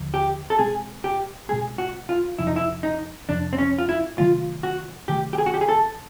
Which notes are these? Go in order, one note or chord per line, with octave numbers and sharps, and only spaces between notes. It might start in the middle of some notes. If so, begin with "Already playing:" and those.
Already playing: D#2 D3 F3
G4
A4
B2 G#3 C4 G#4
G4
B2 G#3 C4 G#4
F#4
F4
F2 C3 F3 E4
D#4
E4
D#4
F2 C3 F3 D4
C4
C#4
F4
E4
C3 D#3 F#3 A3 F4
F#4
C3 D#3 F#3 A3 G4
G4
G#4
F#4
G4
G#4
A4